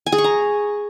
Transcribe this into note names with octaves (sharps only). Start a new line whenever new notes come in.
G#5
G#4
C#6
A#5